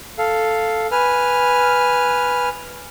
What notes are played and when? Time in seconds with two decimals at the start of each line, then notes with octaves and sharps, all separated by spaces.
0.18 A4 F5
0.92 B4 G#5 F6